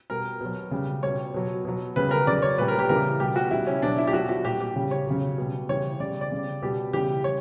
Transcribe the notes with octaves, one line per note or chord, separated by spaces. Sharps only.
B2 G3 A#4
B2 F#3
C#3 G3
B2 G3 C#5
B2 F#3
B2 F#3
C#3 G3 B4
A#4
C#3 F#3 D5
C#5
A#2 G3 B4
A#4
G4
C#3 E3 G3 A#4
B2 G3 G4
F#4
C#3 G3 E4
C#4
B2 F#3 D4
E4
G4
B2 F#3 F#4
F#4
A#2 G3 G4
G4
C#3 G3
C#5
C#3 F#3
B2 G3
C#3 E3 G3 C#5
C#3 G3 D5
D5
C#3 G3
B2 G3 G4
C#3 E3 G3 G4
G3 C#5